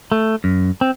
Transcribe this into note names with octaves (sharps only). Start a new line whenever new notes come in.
A3
F#2
C4